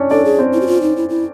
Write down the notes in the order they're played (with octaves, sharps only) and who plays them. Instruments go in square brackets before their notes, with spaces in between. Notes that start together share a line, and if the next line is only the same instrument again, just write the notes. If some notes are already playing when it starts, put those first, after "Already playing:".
Already playing: [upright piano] C#4 D4 C#5 D5
[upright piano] D4 D5 [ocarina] A4
[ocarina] G#4
[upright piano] C4 C5
[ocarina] E4
F#4
F4
D#4
E4
E4